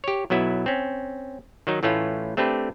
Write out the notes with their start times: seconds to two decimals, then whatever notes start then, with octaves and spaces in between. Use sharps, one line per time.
0.04 G4 C#5
0.30 B1 F#3 B3 E4
0.66 C4 C#4
1.67 D#3 F#3 D#4
1.83 A2 E3 A3 C#4 F4
2.37 A3 C4 D4 G4 B4